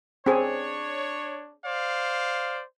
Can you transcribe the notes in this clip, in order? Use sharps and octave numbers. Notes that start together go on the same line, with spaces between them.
C4 D4 G#4 C#5
C5 D5 F5